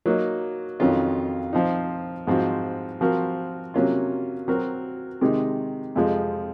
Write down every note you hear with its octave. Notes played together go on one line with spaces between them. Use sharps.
F#3 A#3 D#4
F2 D#3 F#3 C#4 F4
F3 C4 D#4
G#2 F3 C4 F#4
F3 C4 F#4 A#4
C3 F#3 A#3 C#4 F4
F#3 C4 F#4 A#4
C3 D#3 G#3 D#4
F2 C3 F3 G#3